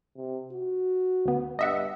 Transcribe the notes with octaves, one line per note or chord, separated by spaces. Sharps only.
C3
F#4
D2 B3
G2 D#5 E5 F#5